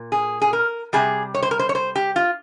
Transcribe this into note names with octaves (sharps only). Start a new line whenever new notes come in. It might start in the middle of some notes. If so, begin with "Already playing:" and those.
Already playing: A#2
G#4
G#4
A#4
C3 G3 G#4
C#5
C5
A#4
C5
C#5
C5
G4
F4